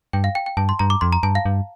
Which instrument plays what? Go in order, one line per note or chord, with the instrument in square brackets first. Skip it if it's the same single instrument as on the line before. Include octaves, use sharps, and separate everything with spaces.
[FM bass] G2 [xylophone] G5
[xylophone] F5
G5
G5
[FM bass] G2 [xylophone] A5
[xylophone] C6
[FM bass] G2 [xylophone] A#5
[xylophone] D6
[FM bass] F2 [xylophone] C6
[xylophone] A#5
[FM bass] G2 [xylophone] A5
[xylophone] F5
[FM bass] G2